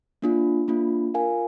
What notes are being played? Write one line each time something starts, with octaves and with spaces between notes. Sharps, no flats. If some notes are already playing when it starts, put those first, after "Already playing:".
A#3 D4 F4
A#3 D4 F4
F4 A#4 F5 G#5